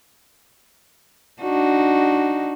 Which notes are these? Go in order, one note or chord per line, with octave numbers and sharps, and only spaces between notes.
D4 D#4 F#4